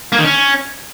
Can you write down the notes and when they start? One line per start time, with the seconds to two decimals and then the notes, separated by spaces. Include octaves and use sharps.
0.12 A#3
0.18 D#3
0.24 C#4